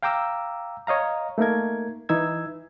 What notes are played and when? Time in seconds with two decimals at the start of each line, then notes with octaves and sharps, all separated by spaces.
0.03 F5 G5 A#5 D6 E6
0.87 C#5 D#5 F5 A#5
1.38 A3 A#3 D#4 A#4 G#6
2.09 E3 D#4 E6 G#6